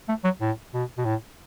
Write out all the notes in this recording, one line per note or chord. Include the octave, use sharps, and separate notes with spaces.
A3
F#3
A2
B2
B2
A2